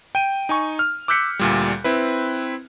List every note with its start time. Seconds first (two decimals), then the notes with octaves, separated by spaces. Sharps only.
0.15 G5 D#7
0.49 D#4 G#5 C#6
0.79 F6
1.08 D6 E6 F#6 G6 B6 C#7
1.39 D2 A#2 G3
1.84 C4 E4 B4